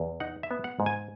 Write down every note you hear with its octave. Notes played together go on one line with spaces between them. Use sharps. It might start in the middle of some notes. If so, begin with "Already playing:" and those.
Already playing: E2
D#4 F#5
E5
B3
F#5
G#2
G#5